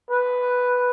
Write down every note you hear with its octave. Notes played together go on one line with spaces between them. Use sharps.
B4